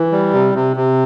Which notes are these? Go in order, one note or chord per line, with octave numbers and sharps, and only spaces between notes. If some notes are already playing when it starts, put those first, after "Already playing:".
Already playing: E3
G3
C3
C3
C3